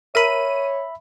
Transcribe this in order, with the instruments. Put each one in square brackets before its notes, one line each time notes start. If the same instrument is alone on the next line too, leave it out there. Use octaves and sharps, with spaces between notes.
[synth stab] A#4 D#7 [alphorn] C#5 [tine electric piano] E5 B5